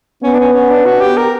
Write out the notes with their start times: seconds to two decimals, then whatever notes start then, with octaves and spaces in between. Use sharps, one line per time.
0.23 B3 C#4
0.33 D4
0.39 C#4
0.54 C#4
0.70 D4
0.86 F#4
1.01 G4
1.17 A#4